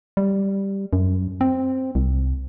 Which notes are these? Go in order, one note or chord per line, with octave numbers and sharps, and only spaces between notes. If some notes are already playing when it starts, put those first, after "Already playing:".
G3
F#2
C4
C2